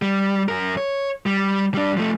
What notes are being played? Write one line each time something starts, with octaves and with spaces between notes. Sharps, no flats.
G3
F#2 A#4
C#5
G3
G3 D4
F3 A3